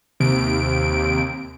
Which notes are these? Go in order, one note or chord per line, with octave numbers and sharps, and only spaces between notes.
D#2 C3 D7